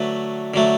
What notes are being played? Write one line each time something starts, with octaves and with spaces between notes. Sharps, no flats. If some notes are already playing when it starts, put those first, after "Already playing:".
Already playing: D3 F#3 A3 B4
D3 F#3 A3